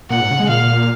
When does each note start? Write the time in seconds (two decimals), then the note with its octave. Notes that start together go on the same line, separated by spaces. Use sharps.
0.10 A#2 F#5
0.21 G#2
0.31 C#3
0.40 G#3
0.49 A#2 F5